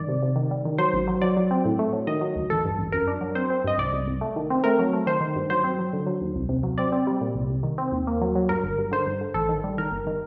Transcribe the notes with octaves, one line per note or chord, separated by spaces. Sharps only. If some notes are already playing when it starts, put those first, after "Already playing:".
Already playing: G2 D#3 D5
C3
C3
D#3
G3
D#3
F#3 C5
A1
F#3
F#3 D5
F#3
C4
A2
A3
F#3
D#3 D#5
F#3
D2
A1 A4
G2
A1
F#2 A#4
D4
F#3
C4 C5
C4
G2 D#5
C2 D5
C2
C2
A3
D#3
C4
A3 A#4
F#3
A3
D#3 C5
D#3
G2
F#3 C5
C4
F#3
D3
F#3
D#2
C2
C3
F#3
C4 D5
C4
G3
A#2
C2
C2
D#3
C4
D#2
A#3
F#3
F#3
G2 A#4
G1
G2
D3 C5
G2
D3
A1 A4
D#3
G3
D#3 A#4
G1
D#3